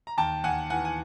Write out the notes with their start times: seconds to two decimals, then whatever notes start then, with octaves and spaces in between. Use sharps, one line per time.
0.07 A#5
0.18 D#2 G5 A5
0.44 D#2 F#5 G#5
0.70 E3 F#5 G#5
0.85 G#5